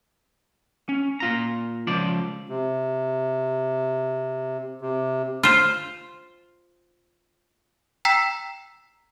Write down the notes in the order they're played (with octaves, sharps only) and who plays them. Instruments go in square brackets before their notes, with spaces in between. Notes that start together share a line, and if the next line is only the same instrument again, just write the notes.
[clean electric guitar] C#4
A#2 F4 A#5
C#2 F3 D5
[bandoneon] C3
C3
[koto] F4 C5
[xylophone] G5 A#5 E6 B6 C7 E7